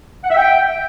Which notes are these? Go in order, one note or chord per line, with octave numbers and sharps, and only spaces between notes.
F#5
E5
G5